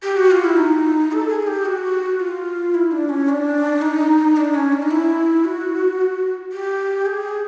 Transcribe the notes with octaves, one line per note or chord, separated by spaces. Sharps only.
G4
F#4
F4
E4
D#4
A4
G#4
G4
F#4
F4
E4
D4
C#4
D4
D#4
D4
C#4
D4
D#4
E4
F#4
G4
G#4